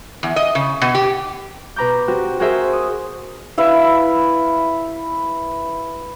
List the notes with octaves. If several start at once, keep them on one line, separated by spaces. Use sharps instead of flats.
E2
D#5
C#3
B2
G4
B2 B4 A#5 D6 G6
C4 F#4 G4
F#4 G#4 A#4 C5 E5
D#6
E4 B4 E5 F5